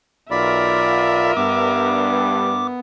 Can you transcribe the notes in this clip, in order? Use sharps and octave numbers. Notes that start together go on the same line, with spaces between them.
B1 F4 A#4 D5 E5 B5
G2 B3 D6